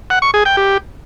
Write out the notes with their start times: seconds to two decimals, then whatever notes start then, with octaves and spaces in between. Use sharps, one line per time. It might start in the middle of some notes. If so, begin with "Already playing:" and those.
0.10 F#5
0.22 C#6
0.34 G#4
0.45 G5
0.57 G4